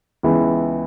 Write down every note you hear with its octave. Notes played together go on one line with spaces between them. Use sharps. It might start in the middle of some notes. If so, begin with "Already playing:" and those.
C#2 C#3 E3 B3 E4